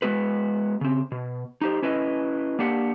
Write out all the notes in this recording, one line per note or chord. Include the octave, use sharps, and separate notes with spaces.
G#3 B3 F#4 B4
C#3 C4
B2
D#4 G4 C5
C#4 E4 B4 D#5
A#3 D4 G4 F#5